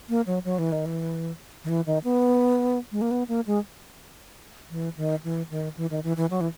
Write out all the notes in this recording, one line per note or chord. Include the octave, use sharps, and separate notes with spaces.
A#3
F#3
F#3
E3
D#3
E3
D#3
E3
D#3
B3
G#3
A#3
B3
A#3
G#3
E3
D#3
E3
D#3
E3
D#3
E3
E3
F#3
E3